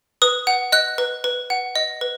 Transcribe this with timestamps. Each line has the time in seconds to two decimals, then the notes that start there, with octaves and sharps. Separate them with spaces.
0.22 B4 D#6
0.47 F#5
0.72 D#5 F#6
0.98 B4
1.24 B4
1.50 F#5
1.76 D#5
2.01 B4